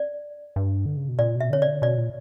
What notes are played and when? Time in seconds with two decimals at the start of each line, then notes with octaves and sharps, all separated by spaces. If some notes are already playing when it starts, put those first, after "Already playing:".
Already playing: D5
0.56 G2
0.86 D3
0.97 C#3
1.09 B2
1.19 A#2 D5
1.36 B2 E5
1.50 D3 C#5
1.62 C#3 D5
1.67 D3
1.82 B2 D5
1.98 A#2